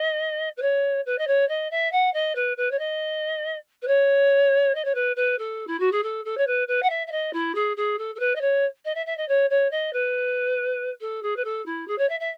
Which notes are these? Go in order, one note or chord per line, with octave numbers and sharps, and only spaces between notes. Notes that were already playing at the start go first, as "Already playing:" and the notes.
Already playing: D#5
B4
C#5
B4
D#5
C#5
D#5
E5
F#5
D#5
B4
B4
C#5
D#5
B4
C#5
D#5
C#5
B4
B4
A4
E4
F#4
G#4
A4
A4
C#5
B4
B4
F#5
E5
E5
D#5
E4
G#4
G#4
A4
A4
B4
D#5
C#5
D#5
E5
E5
D#5
C#5
C#5
D#5
B4
A4
G#4
B4
A4
E4
G#4
C#5
E5
E5